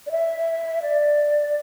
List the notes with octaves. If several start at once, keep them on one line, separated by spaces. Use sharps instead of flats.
D5
E5
D5